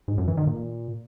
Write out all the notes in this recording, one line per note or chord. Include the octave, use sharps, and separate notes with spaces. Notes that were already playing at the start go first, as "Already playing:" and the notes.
G#2
F#2
E3
D#3
A#2